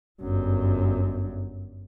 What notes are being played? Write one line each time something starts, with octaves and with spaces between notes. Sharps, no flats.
G1 F#2